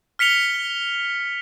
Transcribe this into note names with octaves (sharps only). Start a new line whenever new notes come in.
F6 B6 C#7 F7 G7